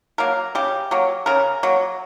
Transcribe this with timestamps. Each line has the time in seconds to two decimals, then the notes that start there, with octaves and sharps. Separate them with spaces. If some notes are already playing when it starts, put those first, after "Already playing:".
0.18 F#3 A#3 A#4
0.55 C#3 G4
0.91 F#3 A#3
1.26 C#3 A#4
1.63 F#3 A#3